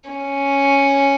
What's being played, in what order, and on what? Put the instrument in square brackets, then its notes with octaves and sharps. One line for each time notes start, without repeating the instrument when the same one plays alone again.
[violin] C#4